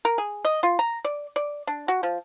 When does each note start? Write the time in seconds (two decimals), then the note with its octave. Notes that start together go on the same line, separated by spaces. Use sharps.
0.05 A#4
0.18 G#4
0.45 D#5
0.63 F4
0.79 A#5
1.05 D5
1.36 D5
1.67 D4
1.88 F#4
2.03 F3